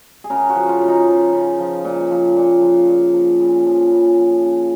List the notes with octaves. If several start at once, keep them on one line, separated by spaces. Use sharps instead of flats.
G#4
C#3 A#4
F#4
F3
F4
C#3
D#4
F3
C#3
F3
A#2
F3
A#2
F3
A#2
F3
C#3
F3
C#3
F3
C#3